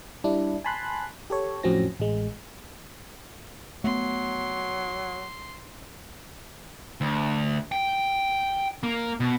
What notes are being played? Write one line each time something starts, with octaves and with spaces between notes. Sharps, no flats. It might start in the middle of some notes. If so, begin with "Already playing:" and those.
G3 D4 E4
G#5 A5 B5 C6 F#6
G4 A4 C#5
F2 A2 F#3 C4 C#4 A#6
A1 G#3
F#3 A3 B3 C6
D2
G5
A#3
B2